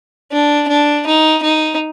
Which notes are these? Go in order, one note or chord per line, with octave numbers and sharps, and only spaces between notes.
D4
D4
D#4
D#4